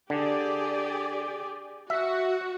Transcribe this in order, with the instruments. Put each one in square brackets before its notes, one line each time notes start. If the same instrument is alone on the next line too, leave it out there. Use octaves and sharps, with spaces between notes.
[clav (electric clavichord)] D3 [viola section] G4 G#4 D5
[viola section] F#4 [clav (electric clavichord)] E5